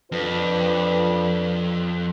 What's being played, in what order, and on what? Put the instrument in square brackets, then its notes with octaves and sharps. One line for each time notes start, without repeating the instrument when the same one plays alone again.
[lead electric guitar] F2 [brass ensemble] D4 F4 B4